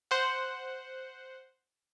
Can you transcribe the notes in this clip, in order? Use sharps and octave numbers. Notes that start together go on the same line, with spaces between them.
C5 F#5